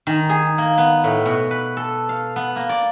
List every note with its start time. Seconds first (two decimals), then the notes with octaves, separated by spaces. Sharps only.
0.07 D#3
0.30 G#4
0.58 A#3
0.78 B3
1.04 A2
1.26 B2
1.51 B4
1.77 A4
2.09 F5
2.36 B3
2.56 A#3
2.69 D5